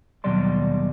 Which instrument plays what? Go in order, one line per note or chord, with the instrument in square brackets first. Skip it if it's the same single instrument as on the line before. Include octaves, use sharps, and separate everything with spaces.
[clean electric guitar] D#2 B2 F#3 G3 D5 C6